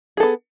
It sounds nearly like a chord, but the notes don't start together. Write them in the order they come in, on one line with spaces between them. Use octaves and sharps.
G#4 A4 B3